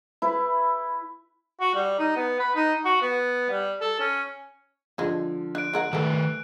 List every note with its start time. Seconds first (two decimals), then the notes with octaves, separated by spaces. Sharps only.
0.22 E4 B4
1.61 F#4
1.75 G3
1.99 D#4
2.16 B3
2.40 B4
2.55 D#4
2.85 F#4
3.02 B3
3.51 G3
3.81 A4
4.00 C#4
4.98 D3 F3 G3 G#3
5.55 D4 F#6 D7
5.73 G#3 A#4 F#5
5.93 D#3 G3 A3 A4 B4